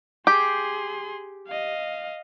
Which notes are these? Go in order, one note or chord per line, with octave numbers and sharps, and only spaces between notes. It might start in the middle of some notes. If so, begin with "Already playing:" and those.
G4 G#4 C6
D#5 F5